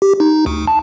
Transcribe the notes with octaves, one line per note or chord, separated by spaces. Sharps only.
G4
D#4
D2
A5